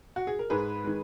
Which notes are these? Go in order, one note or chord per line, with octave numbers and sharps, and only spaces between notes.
F#4
G#4
A#4
G#2 G#4 B4
D#3 G#3